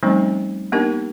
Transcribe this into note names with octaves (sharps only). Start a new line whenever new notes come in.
F3 G3 A3 C4 C#4 D#4
A#3 B3 D4 D#4 G4 A#4